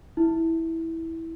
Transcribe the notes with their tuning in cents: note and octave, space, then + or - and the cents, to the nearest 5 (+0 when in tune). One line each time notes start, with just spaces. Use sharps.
E4 -10